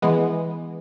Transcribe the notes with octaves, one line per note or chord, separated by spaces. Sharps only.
E3 G#3 B3